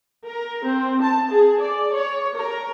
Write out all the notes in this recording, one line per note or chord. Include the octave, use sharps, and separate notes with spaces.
A#4
C4
A5
G#4
D5
C#5
A#4